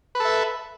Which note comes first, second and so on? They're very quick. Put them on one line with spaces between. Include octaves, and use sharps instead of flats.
B4 A4 E5